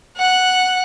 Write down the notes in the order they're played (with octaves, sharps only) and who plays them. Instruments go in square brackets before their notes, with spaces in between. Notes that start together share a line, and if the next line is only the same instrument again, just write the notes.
[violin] F#5 F#6